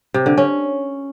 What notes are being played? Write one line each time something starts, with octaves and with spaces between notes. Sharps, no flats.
C3
D3
C#4